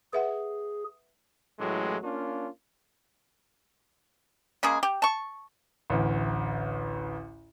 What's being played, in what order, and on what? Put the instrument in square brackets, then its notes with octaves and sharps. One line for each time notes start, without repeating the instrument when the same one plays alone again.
[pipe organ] G#4 [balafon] B4 E5 F#5
[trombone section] A1 A2 F#3 G#3
A#3 C#4 D4 F4
[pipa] C#3 G#3 A#3 G#4
G4
A5 C#6
[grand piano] A1 D2